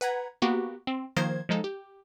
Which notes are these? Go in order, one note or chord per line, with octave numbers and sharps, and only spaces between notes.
B4 F#5 A#5 G#6
A#3 B3 F#4 G4
C4
D#3 F3 A#3 C5 G#6
F3 G#3 D#4 A4
G4